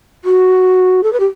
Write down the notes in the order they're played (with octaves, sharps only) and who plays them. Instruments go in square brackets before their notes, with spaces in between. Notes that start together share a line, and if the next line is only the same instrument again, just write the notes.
[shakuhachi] F#4
A4
B4
G4